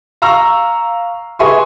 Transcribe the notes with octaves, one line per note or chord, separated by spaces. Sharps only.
F5 A#5 C#6 E6
G#4 B4 E5 G#5 C6 C#6